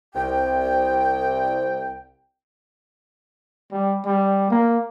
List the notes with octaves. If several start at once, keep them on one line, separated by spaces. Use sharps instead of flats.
C2 G5
G3
G3
A#3